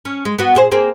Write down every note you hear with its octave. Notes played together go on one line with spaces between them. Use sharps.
C#4
G#3
B3 F#4
A#2 G#4 C5
A#3 C4 G#4